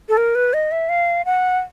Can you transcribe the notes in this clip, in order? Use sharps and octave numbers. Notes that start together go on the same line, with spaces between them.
A4
A#4
B4
D#5
E5
F5
F#5